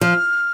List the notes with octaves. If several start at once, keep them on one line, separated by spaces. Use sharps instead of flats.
F3 F6